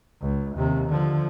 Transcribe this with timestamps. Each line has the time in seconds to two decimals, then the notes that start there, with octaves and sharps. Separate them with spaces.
0.21 C#2
0.56 D#2 C3
0.89 D3 F3